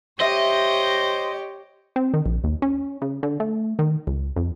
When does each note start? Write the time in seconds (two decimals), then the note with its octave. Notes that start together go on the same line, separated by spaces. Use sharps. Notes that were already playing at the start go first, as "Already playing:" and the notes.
0.21 G4 C5 C#5 D#5 E5
1.96 C4
2.14 D#3
2.26 A#1
2.44 D#2
2.62 C#4
3.02 C#3
3.23 D3
3.40 A3
3.79 D#3
4.07 C#2
4.36 F2